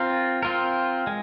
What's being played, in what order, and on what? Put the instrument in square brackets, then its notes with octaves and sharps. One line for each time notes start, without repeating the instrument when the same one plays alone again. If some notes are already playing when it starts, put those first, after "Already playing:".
Already playing: [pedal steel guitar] C4 F4 A#4
C4 F4 A#4
G#3